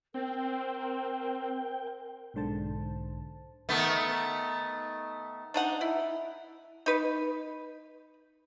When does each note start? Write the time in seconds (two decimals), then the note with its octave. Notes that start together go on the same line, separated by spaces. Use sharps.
0.14 C4 A#4 G5
2.34 B1 G#2 D3 C5 A5
3.69 D#3 A3 B3
5.54 D4 D#4 F#5
5.81 E4
6.86 D#4 B4